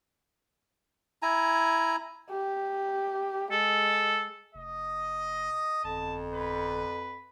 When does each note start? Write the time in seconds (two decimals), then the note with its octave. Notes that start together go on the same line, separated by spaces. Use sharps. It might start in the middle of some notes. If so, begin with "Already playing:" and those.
1.22 E4 G#5 A#5
2.30 G4
3.52 G#3 A4
4.55 F1 D#5
5.84 G1 F2 A5
6.33 B4